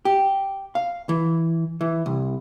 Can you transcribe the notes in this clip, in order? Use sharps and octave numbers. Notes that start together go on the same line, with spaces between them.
G4
F5
E3
E3
C2